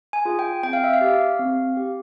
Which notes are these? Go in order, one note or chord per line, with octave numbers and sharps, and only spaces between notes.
G#5
F4 G#4
G5
C4 G5
F5
E5
F5
G4
C4
G4